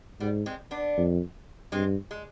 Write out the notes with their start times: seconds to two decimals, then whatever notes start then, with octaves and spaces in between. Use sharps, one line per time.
0.20 G#2 G3 B3
0.46 G#3 C4
0.71 B3 D4
0.97 F2
1.72 G2 G#3 C4
2.11 G#3